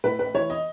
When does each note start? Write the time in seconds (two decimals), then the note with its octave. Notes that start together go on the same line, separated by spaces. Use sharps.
0.04 A2 B4
0.19 A1 B4
0.34 E3 C#5
0.50 D#5